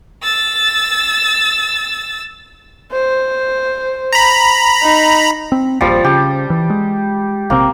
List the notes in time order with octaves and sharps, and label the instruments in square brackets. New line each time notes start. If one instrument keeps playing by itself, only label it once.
[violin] E6 A6
[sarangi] C5
[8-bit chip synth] A#5 B5
[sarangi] D#4
[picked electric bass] C4
[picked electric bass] D#1 A#1 A#2 [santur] F3 G3
[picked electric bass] C#3 [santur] G4
[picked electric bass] E3
G#3
[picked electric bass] A#1 C3 C4 [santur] A#3